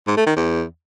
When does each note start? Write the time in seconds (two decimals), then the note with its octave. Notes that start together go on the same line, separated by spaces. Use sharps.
0.07 G#2
0.17 A3
0.27 D#3
0.36 E2